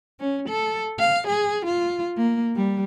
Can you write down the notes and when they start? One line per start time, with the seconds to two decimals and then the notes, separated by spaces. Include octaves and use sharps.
0.20 C#4
0.49 A4
0.99 F5
1.27 G#4
1.66 F4
2.18 A#3
2.56 G3